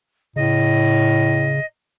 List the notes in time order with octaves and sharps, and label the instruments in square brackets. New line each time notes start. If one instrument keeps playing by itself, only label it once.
[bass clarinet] A2 [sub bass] C#3 [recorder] D#5